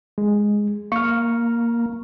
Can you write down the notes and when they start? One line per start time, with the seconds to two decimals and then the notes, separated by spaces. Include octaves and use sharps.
0.18 G#3
0.92 A#3 C#6 F6